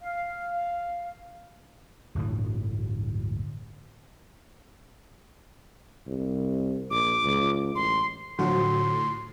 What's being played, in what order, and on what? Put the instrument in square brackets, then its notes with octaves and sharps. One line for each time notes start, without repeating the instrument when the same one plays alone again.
[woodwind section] F5
[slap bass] D1 G1 A2 E3
[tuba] C2
[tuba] A#1 [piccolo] D6
[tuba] C#2
[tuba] A1 [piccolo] C6
[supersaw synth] A2 [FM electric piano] D3 F#4 [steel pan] F3 F#3 [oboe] C6